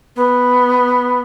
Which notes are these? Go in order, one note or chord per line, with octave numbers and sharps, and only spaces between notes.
B3